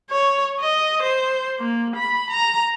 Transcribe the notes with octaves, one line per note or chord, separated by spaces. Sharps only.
C#5
D#5
C5
A#3
B5
A#5